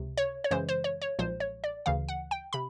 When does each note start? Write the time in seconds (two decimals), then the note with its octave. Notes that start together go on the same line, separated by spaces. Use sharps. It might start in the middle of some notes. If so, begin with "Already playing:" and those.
Already playing: C#2 C3
0.17 C#5
0.44 C#5
0.51 F#2 C#3 E3 G#3 C5
0.69 C5
0.84 C#5
1.02 C#5
1.19 B1 A#2 F3 G#3 C5
1.40 C#5
1.64 D5
1.86 D2 C#3 E3 F5
2.09 F#5
2.31 G5
2.53 C3 B5